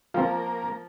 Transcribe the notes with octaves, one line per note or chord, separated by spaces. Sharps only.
F3 A#3 C4 F5